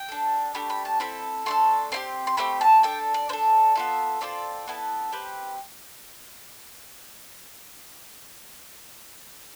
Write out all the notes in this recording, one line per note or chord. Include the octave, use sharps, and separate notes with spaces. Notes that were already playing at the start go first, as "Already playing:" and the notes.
Already playing: G5
D4 A4
A3 D4 G4 B5
B5
A5
C4 E4 A4 B5
A3 D4 A4 C6
C4 E4 G4 C6
C6
A3 C4 G4 B5
A5
D4 A4 G5
D5
D4 A4 C5
B3 F4 A4 E5
C4 F4 A4 D5
B3 E4 A4
C4 G4 B4